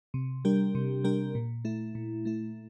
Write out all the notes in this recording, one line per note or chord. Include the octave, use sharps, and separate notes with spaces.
C3
G3 D4 G4 A#4
C3
G3 D4 G4 A#4
A#2
A3 E4
A#2
A3 E4